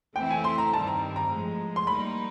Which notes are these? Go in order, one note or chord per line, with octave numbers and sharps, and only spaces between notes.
E3 A3 C4 E4 G5
G#5
C6
A#5
G2 D#3 G3 C4 A5
A#5
A#5
A2 F3 G#3
C6
G3 A#3 D#4 B5